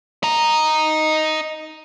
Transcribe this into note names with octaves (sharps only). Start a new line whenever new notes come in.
D#5 A#5